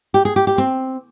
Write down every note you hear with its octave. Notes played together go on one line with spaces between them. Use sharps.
G4
G#4
G4
G4
C4